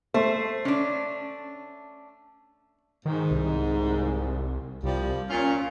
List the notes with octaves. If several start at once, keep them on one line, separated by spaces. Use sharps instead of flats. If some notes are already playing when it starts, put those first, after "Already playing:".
A3 C5
C#4 D4
G#2 D#3
C2
C2 F3 G3
A#2 C#4 F4